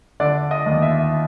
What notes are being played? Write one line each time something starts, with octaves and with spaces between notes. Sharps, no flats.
D3 D5
D#5
D#2
E5